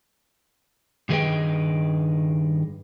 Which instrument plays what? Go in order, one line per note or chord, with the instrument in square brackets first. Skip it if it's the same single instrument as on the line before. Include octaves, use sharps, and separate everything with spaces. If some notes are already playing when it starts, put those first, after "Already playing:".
[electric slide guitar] G2 D#3 G#4 B4 D#5 G5